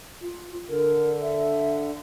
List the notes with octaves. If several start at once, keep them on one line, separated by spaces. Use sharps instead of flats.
F4
D3 A#4
E5